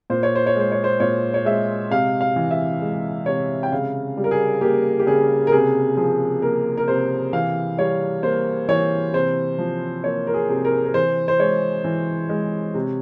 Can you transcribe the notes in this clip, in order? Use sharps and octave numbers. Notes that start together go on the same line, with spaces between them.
A#2 C5
C#5
C5
C#5
G#3 C5
C#5
C5
A#2 C#5
C#5
G#3 E5
C3 F5
F5
E3
E5
G#3
C3 C#5
G5
C#3 F5
G3
A#4
G#4
A#3 G4
G4
C#3 G#4
A#4
C3 G#4
F3 G#4
A#3 A#4
A#4
C3 C5
E3 F5
G3 C#5
A#3 C5
E3 C#5
C3 C5
F3
A#3 C#5
A#4
G#4
C3
A#4
A#4
E3 C5
C5
G#3 C#5
E3
G#3
C3